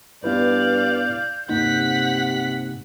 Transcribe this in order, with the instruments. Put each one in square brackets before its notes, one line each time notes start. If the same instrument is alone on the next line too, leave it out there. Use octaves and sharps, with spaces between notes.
[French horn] G2 [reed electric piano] B3 E4 B4 [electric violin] D5 F5 [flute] G6
[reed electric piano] G2 A#3 D#4 [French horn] C3 [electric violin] F#5 B6